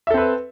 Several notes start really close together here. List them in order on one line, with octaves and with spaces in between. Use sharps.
E5 A4 C4 B4